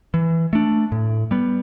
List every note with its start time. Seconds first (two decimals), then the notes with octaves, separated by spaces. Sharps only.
0.14 E3
0.53 A3 D4
0.92 A2
1.31 G3 B3